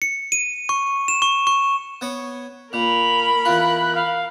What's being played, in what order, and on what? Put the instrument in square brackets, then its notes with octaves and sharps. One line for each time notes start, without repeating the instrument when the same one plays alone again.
[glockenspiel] C#7
D#7
C#6
E7
C#6
C#6
[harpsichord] B3 C#5 B5
[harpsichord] A#2 [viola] A#4 B5 [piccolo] F7
[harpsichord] E2 F4 [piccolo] F#6
[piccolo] F5